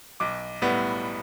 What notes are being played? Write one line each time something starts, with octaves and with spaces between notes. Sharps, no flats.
B1 D6
A2 G3 B3